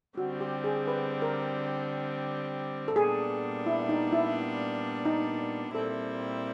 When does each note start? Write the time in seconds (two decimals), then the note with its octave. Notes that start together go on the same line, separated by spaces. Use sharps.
0.17 D3 G3 C4 F#4
0.41 G4
0.64 G#4
0.88 B4
1.22 A#4
2.88 A4
2.96 A#2 G3 B3 D4 G#4
3.66 E4
3.89 D#4
4.12 E4
5.05 D#4
5.75 A#2 G3 C4 E4 A4